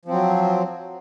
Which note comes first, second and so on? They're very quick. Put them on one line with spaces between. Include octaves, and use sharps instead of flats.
F3 C4 F#3